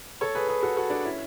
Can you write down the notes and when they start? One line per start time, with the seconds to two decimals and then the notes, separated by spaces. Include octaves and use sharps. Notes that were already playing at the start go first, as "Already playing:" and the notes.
0.21 A4 C#5
0.35 G#4 B4
0.49 G#4 B4
0.63 F#4 A4
0.77 F#4 A4
0.90 D4 F#4
1.04 C#4 E4